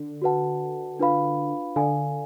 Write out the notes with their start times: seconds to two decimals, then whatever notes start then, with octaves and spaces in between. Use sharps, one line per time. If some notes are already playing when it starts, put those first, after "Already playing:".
Already playing: D3
0.22 F#4 B4 F#5 A5
0.99 D4 F4 B4 F5 B5
1.76 D3 A4 D5 F5 G#5